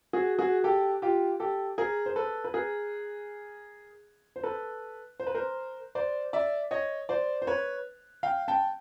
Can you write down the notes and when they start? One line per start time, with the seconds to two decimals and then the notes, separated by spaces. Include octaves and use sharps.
0.13 F#4 G#4
0.38 F#4 G#4
0.64 G4 A4
1.02 F4 G4
1.40 G4 A4
1.78 G#4 A#4
2.06 C5
2.16 A4 B4
2.44 B4
2.54 G#4 A#4
4.36 C5
4.43 A4 B4
5.20 C5
5.27 B4
5.35 A#4 C5
5.95 C5 D5
6.33 D5 E5
6.71 C#5 D#5
7.09 C5 D5
7.42 C5
7.47 B4 C#5
8.23 F5 G5
8.48 G5 A5